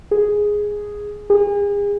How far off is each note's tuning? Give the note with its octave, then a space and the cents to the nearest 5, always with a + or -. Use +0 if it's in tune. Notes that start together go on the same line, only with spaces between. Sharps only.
G#4 +0
G#4 -35